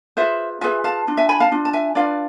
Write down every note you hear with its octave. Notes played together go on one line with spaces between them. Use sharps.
F4 G#4 B4 C5 E5
F4 G#4 B4 E5 G#5
F5 A5
D4 F4
E5 G#5
G#5 B5
F5 A5
D4 F4
A5
E5 G#5
D4 F4 B4 D5 F5